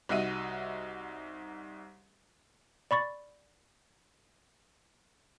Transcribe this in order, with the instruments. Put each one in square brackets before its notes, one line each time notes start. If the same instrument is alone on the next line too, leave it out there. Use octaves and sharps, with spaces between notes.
[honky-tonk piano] C2 D#4 F#4 E5 D#7
[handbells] D5 B5 C#6 A6